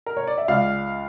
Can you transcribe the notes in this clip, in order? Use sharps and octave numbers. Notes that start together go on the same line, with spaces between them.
A#4
C#5
D5
E5
C#2 D5 F5